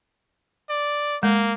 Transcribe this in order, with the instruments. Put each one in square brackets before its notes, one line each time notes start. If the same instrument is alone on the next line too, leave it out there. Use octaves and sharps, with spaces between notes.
[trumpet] D5
[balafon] G#3 [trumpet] A#3